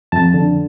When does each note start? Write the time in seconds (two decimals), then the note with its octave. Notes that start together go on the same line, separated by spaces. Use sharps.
0.12 F2 A5
0.34 D3